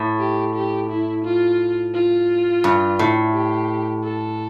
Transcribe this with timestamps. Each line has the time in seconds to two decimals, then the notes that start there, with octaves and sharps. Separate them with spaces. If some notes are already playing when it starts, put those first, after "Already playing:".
Already playing: A2
0.19 G4
0.55 G4
0.90 E4
1.25 F4
1.94 F4
2.64 G2
2.99 A2
3.34 G4
4.04 A4